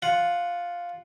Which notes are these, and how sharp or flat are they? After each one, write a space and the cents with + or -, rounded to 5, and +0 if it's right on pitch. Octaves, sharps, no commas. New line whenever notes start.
F4 +0 F#5 +0